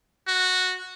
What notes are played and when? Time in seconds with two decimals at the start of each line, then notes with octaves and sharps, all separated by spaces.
0.27 F#4